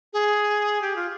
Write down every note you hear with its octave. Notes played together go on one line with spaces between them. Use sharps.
G#4
G4
F4